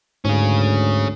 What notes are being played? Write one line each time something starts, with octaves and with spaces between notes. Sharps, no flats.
D2 G#2 C#4 G#4